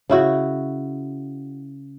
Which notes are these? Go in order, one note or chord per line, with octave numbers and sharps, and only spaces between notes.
C#3 E4 F#4